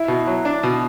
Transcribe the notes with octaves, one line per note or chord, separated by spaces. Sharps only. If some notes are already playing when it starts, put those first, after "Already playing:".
Already playing: E4
B2
F#3
D4
B2